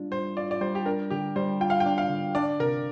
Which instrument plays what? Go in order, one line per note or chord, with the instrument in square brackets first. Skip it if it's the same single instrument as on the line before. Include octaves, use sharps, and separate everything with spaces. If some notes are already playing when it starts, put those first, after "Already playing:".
Already playing: [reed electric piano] G3 D4 F4
[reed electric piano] G3 [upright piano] C5
[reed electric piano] F4 [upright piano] D5
[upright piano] D5
[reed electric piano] G3 [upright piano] C5
[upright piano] G4
[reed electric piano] D4 [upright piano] A#4
[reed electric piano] D3 [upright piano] G4
[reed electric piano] G3 [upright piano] C5
[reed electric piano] F4 [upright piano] G5
[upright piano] F5
G5
[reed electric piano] D4
[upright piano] F5
[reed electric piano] D3
[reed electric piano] D4 [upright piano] D5
[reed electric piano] C3 [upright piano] A#4